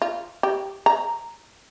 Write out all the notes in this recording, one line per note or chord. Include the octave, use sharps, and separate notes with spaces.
F4
G4
A#5